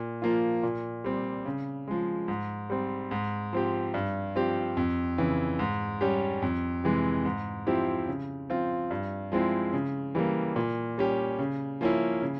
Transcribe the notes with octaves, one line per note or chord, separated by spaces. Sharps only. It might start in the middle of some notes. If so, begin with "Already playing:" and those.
Already playing: A#2
F3 A#3 F4
A#2
G3 C4
C#3
F3 G#3
G#2
G3 C4
G#2
F3 C4 G4
G2
F3 C4 G4
F2
C#3 E3
G#2
G3 C#4 G4
F2
C3 E3 G#3
G#2
F3 C4 E4 G4
C#3
F3 C4 F4
G2
F3 G#3 C4 E4
C#3
E3 G3 A#3
A#2
G3 C#4 G4
C#3
F3 A#3 C#4 E4
C#3